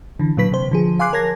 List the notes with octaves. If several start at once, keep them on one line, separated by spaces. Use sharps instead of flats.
D3 E3
A#2 D3 F#3 B4 B6
C3 C5
D3 F3 G#4
F5 G#5 C6 D6 F#6 C7
A#4 C#5 A5 G#6 A#6